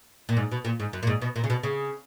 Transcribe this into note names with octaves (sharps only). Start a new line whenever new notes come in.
A#2
G#2
B2
A#2
G#2
F#2
A#2
G#2
B2
A#2
C#3
B2
C#3